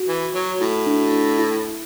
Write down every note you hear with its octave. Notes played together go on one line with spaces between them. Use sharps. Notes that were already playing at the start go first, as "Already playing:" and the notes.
Already playing: F#4
E3
F#3
A2 E4
D4
D4
E4